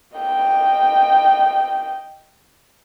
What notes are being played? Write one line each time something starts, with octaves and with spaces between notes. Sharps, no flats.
D#5 G5